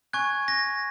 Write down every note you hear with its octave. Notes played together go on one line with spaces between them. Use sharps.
G#5 C#6 F#6 G#6
A#6